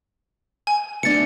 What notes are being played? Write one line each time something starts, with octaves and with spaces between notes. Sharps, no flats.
G#5
A3 D4 A6 C#7